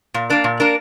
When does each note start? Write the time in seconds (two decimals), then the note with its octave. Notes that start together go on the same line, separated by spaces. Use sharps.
0.14 A#2
0.30 A#3 D4 A#4
0.44 A#2
0.60 A#3 D4 A#4